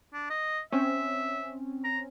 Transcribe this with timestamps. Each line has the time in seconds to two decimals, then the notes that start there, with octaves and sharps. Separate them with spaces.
0.13 D4
0.30 D#5
0.72 C4 C#4 E5
1.84 A#5